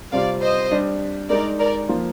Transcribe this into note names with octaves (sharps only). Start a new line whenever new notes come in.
C3 G3 C4 F4 D5 F5
C5 D#5
G3 D4 G4
G#3 D#4 G#4 A#4 D5
A#4 D5
F3 A#3 F4